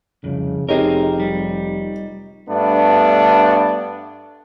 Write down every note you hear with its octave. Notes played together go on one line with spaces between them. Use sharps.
C2 F2 C#3
F1 C4 D#4 G4 G#4 A#4 C#5
G3
G2 A3 B3 D4